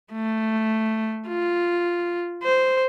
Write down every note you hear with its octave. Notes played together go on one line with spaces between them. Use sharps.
A3
F4
C5